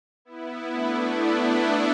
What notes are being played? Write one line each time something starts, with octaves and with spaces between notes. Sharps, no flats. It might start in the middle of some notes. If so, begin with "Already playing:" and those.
B3 E4
A3 D4
B3 E4
A3 D4